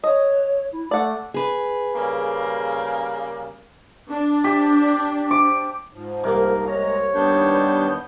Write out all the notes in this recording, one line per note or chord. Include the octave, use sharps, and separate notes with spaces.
C#5 D#5
E4
A3 D5 F#5
G#4 B4
C#3 G3 A#3
D4
G4
D6
G#2 F3
C2 A#3 A#4
G#3 C#5 A#5
D#2 G3 B3 D4 G6